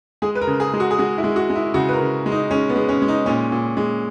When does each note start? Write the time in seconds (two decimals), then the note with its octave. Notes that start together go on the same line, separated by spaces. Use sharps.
0.22 G#3 G#4
0.35 B4
0.41 A#4
0.47 C#3
0.60 G#4
0.74 G#3
0.80 F#4
0.91 G#4
0.99 G#3 F#4
1.18 E4
1.24 G#3
1.36 F#4
1.50 G#3
1.55 E4
1.74 C#3 F#4
1.89 B4
1.93 A#4
2.00 C#3
2.26 G#3
2.32 D#4
2.51 G#3 C#4
2.69 B3
2.76 G#3
2.89 C#4
3.02 G#3
3.08 D#4
3.26 A#2 C#4
3.52 A#2
3.77 G#3